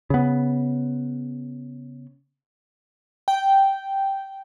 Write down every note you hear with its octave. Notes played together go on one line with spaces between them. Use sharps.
C#3 B3
G5